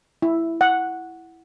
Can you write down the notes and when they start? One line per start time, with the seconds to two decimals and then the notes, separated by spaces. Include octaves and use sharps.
0.22 E4
0.61 F#5